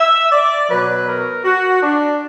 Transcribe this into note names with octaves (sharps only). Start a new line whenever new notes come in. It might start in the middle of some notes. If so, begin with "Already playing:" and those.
Already playing: E5
D5
B2 F#3 B4
A#4
F#4
D4